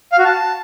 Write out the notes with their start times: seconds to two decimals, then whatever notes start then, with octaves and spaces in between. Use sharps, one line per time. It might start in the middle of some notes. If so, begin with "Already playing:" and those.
0.12 F5
0.18 F#4
0.25 A5